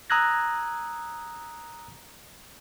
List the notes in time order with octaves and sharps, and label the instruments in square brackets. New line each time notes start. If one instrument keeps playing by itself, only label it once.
[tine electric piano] A#5 D#6 E6 F#6 G#6 A#6